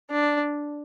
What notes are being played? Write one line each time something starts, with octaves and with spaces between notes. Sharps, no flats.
D4